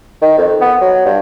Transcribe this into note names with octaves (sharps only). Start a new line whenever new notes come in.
D#3
F2
B3
F#3
G2